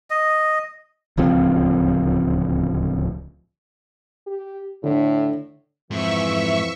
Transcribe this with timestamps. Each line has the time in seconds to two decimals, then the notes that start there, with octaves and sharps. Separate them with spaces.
0.10 D#5
1.17 D1 C#2 F3 C4
4.27 G4
4.84 A2 D3
5.91 F2 G#2 E3 E5 C#6